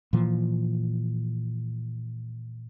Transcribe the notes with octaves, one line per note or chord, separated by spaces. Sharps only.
A#2 E3 F3